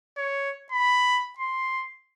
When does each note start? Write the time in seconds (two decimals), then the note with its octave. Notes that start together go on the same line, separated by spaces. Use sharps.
0.17 C#5
0.72 B5
1.38 C6